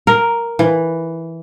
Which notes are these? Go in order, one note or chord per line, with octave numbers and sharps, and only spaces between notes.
A#4
E3